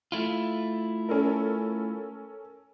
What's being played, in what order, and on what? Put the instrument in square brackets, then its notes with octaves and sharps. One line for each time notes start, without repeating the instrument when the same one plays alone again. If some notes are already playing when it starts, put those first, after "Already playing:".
[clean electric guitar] A3 E4 F4
[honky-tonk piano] C#4 A4 A#4